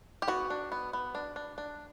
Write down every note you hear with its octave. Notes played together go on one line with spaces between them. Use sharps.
G4
B3 F#4
D4
B3
B3
D4
D4
D4